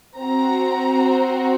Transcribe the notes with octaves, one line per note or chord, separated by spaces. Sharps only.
C4 F#4 A#5